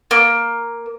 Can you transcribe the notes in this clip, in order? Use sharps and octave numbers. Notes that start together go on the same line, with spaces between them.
A#3